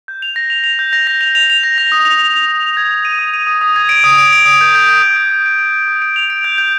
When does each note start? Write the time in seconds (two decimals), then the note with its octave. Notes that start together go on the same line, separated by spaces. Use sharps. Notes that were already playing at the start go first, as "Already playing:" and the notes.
0.08 G6
0.22 F7
0.36 A#6
0.50 F7
0.64 F7
0.79 G6
0.93 A#6
1.07 A#6
1.21 F7
1.35 F7
1.50 F7
1.63 A#6
1.78 A#6
1.92 D#6
2.05 F7
2.19 F7
2.34 F7
2.49 D#6
2.63 F7
2.77 G#6
2.91 G#6
3.05 D#7
3.19 D#6
3.34 D#7
3.47 D#6
3.61 D#6
3.76 G#6
3.89 D7
4.04 D#6
4.18 D7
4.33 D7
4.46 D#6
4.61 G6
4.75 G6
4.89 G6
5.02 D#6
5.16 D7
5.30 D7
5.46 D7
5.59 D7
5.74 D7
5.88 D#6
6.02 D7
6.16 F7
6.30 D7
6.44 G6
6.58 G6